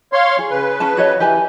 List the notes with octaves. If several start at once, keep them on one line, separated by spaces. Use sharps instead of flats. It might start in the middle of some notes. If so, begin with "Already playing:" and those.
C#5 F5 C6
G#4
C#3 B4
C#4 A5
F#4 C#5 D#5
E3 G4 B4 G#5